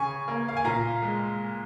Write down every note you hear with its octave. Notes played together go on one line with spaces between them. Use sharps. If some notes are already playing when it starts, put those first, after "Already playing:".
Already playing: C#3 G#5 C#6
A#3
F5
G#5
A#2 F5 A#5
G#3